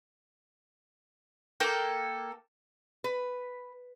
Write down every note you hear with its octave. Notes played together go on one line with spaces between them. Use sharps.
A#3 A4 G5
B4